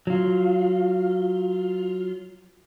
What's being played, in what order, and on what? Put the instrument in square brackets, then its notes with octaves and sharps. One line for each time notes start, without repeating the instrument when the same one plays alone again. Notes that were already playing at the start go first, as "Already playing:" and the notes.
[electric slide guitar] F#3 F4